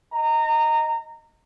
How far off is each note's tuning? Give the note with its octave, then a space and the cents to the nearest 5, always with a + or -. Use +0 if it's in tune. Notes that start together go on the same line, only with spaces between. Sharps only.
D#5 +0 A#5 -20